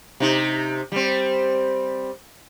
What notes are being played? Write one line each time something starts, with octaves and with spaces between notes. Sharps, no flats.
C3 D#4
G3 C4